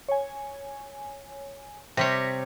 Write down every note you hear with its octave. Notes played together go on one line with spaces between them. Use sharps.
C#5 G#5
C3 G3 C#5 A#6 B6